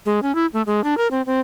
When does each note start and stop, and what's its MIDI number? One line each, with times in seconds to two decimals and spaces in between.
0.06 0.19 56
0.23 0.34 61
0.35 0.46 64
0.53 0.62 57
0.67 0.83 56
0.84 0.97 62
0.98 1.07 70
1.11 1.22 60
1.27 1.40 60